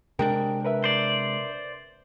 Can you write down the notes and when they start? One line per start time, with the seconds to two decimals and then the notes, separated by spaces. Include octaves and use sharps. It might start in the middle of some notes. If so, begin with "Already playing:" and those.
0.19 C3 G#3 D4 A#4 G5
0.65 A#4 B4 E5
0.84 C5 D5